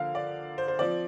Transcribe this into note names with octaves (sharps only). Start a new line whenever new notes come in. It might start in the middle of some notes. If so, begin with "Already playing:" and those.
Already playing: D3 F3 A#3 F5
D5
C5
C5
F3 C4 D5